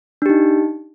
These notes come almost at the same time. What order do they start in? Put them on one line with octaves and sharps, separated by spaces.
D4 G4 D#4